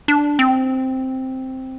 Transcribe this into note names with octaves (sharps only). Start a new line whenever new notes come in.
D4
C4